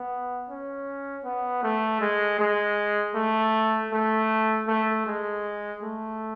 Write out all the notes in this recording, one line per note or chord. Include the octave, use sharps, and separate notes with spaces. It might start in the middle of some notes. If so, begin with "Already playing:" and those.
Already playing: B3
C#4
B3
A3
G#3
G#3
A3
A3
A3
G#3
A3